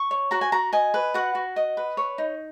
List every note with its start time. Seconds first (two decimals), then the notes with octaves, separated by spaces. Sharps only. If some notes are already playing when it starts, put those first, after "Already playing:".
Already playing: C#6
0.11 C#5
0.31 F#4 A#5
0.41 G#5
0.52 F#4 A#5
0.73 D#5 G#5
0.94 B4
1.14 F#4 F#5
1.35 F#4
1.56 D#5
1.77 B4
1.97 C#5
2.18 D#4